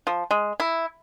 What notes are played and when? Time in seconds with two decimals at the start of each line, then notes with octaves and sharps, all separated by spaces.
0.07 F3
0.31 G#3
0.60 E4